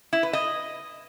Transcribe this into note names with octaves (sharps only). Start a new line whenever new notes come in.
E4
B4
D#5